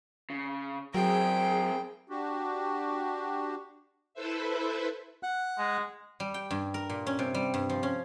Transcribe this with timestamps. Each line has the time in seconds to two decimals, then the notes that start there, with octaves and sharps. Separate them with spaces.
0.30 C#3
0.95 F#3 C4 G#4 A#4 G5
2.10 D4 F#4 G4
4.14 E4 A4 B4 C5 E5
5.23 F#5 F#6
5.58 G#3
6.20 G3
6.34 G5
6.51 G2
6.74 A#4
6.90 A#2
7.07 C#4
7.19 C3
7.34 G3
7.54 G2
7.70 F3
7.83 C#4